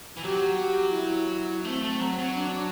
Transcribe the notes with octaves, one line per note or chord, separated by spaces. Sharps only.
E3
F#3 G4
G4
E4
A3 C4
A3
F#3
F#3
D4